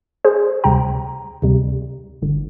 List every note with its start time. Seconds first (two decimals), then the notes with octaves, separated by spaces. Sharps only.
0.25 G#4 C5
0.64 D2 C3 G3 G5 A#5
1.42 D2 C3 G3
2.22 G1 G2 D3